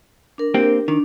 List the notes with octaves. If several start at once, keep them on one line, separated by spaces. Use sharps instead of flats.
D4 A#4
A#3 C4 G4
D#3 D4